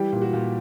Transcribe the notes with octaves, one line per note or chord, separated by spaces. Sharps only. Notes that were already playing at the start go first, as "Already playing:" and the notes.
Already playing: E3 G3 G4
A#2
F#4
A#2